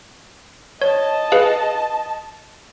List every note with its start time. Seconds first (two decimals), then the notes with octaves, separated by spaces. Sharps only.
0.82 C#5 D#5 A5
1.32 G#4 B4 F5